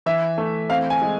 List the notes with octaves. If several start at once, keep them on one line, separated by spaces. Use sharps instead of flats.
E3 E5
A3
C4 F5
G#5
G#3